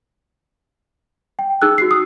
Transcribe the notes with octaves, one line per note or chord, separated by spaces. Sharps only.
G5
D#4 G#4 E6 F#6
F#4 C7
D#6